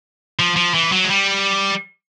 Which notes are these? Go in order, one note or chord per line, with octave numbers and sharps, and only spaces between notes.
F3
F3
E3
F#3
G#3
G3